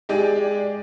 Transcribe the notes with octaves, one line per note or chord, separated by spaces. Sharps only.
G#3 G4 G#4 D5